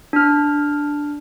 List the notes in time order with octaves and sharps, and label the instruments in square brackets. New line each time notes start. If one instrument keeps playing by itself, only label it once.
[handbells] D4 F6